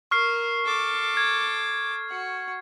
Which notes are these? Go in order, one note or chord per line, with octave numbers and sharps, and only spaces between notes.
A#4 C#6 F6 C7
A4 D6
G#6
F#4 F#5